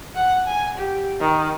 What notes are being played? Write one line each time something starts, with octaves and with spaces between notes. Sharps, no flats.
F#5
G#5
G4
D#3